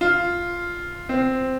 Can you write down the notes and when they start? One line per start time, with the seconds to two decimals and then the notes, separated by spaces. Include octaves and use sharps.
0.01 F4
1.09 C4